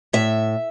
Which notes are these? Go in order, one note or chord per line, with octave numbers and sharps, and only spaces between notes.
A2 E5